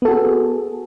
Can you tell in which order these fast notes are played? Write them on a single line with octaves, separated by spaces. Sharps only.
B3 A4 F#4 G#4